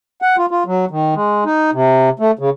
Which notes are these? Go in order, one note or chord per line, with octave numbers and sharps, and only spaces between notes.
F#5
F4
F4
F#3
D#3
G#3
D#4
C3
A3
C#3